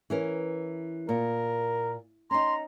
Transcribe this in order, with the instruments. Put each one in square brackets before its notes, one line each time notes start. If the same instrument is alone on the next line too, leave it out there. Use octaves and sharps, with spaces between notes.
[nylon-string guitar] E3 C#4 A#4
[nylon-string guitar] A#2 [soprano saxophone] A#4
[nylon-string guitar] C#4 D#4 [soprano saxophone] A#5 [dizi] C6